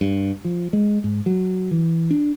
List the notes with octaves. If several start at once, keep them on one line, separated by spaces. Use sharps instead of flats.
G2
F3
G#3
G#2
F#3
E3
D4